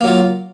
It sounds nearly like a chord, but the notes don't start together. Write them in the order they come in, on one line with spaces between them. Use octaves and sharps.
A#3 F#3 F4